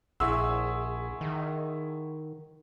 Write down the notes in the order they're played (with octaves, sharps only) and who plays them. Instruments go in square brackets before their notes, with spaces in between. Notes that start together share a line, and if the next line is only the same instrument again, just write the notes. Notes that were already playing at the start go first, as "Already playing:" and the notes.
[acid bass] A#1 [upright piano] E4 G#4 E6 [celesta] F#5 C6 C#6
[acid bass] D#3